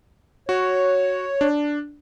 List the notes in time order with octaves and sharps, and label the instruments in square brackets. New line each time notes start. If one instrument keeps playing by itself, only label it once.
[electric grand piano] F#4 [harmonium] C#5
[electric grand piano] D4